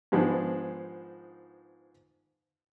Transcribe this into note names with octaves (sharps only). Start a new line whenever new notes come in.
G#2 D#3 F3 G#3 B3 D4